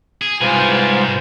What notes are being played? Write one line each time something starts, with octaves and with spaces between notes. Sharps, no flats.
G#4
C2 G#2 F4 B4 C5 G#5